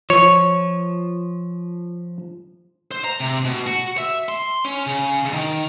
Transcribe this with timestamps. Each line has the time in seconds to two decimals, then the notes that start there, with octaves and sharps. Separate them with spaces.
0.10 F3 C#5
2.91 C5
3.04 A#5
3.20 C3
3.45 B2
3.66 F#4
3.98 E5
4.29 C6
4.65 C#4
4.86 C#3
5.33 D#3